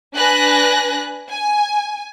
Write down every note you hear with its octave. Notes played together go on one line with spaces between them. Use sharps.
D4 B4 G#5 F#6 A#6
G#5